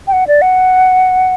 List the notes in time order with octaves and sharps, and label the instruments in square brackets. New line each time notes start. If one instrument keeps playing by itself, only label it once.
[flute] G5
F#5
D5
F#5